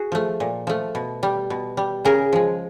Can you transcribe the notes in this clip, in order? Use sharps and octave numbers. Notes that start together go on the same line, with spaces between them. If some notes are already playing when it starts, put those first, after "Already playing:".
Already playing: F#4 G#4
F3 A3
A#2
F3 A3
B2
G3
B2
G3
C#3 G#4 A#4
F3 G#3